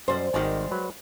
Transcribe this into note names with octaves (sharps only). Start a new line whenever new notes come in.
F#2 G3 C5
G#1 D#3 G3 G#3 G4 G#4
F#3 B4